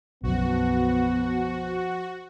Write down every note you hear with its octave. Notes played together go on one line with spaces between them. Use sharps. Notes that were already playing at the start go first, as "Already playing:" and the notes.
B1 F#2 F3 B3 F#4